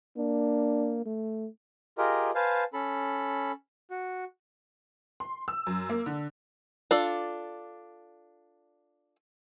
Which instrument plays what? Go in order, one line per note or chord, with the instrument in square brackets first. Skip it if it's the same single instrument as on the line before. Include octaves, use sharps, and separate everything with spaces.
[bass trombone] A#3 [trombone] D4
[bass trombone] A3
[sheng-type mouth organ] F4 G4 G#4 A#4 D#5
B4 C5 F5 G#5 A5
C#4 A4 B5
F#4
[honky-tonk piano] C6
E6
F#2
A#3
D3
[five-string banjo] D4 F4 A4 D5